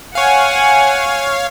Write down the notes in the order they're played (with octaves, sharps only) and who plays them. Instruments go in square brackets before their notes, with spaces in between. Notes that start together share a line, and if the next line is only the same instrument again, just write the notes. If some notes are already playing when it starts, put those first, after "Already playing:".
[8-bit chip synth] C#5 F5 [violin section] F#5 G#5